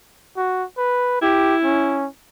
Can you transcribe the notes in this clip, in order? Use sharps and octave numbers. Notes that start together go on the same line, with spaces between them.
F#4
B4
E4 G4
C#4